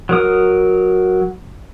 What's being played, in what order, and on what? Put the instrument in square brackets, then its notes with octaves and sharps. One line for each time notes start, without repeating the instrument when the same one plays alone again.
[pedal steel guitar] F#3 A#4 D#6